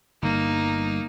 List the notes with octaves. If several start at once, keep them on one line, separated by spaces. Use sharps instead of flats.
G1 G2 A#3 D#4